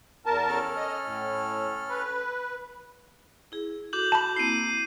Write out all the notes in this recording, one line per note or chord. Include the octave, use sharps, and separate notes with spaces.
E2 A#4 A5
C#4 A4 F6
D#5
A2
B4
E4 G#4
F#4 A4 D6 G6 F#7
A5 B5
A#3 C4 E4 C7 D#7